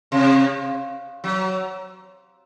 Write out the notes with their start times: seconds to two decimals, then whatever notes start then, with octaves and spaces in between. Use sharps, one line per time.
0.12 C3
1.24 F#3